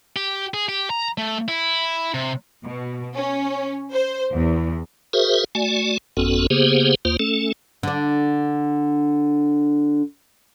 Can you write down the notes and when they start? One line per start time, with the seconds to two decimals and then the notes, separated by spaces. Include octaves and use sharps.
0.16 G4
0.54 G#4
0.69 G4
0.90 A#5
1.18 A3
1.48 E4
2.14 C3
2.65 B2
3.15 C#4
3.93 C5
4.34 E2
5.13 F#4 G#4 A#4 C5 E5
5.55 A3 F#4 D5 G#5
6.17 G1 F2 B3 C#4 F#4 A4
6.50 C#3 A#3 B3 G4 G#4 C5
7.05 D#2 A#3 F4 C5
7.20 A3 C#4 A4
7.83 D3 D4